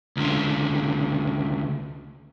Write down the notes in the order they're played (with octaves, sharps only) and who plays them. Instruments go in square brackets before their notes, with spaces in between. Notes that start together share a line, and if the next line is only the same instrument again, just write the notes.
[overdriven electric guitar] C#2 D3